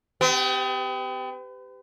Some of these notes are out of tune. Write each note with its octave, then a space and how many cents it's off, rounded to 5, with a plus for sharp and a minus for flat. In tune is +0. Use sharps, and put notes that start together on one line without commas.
B3 +40 G4 +0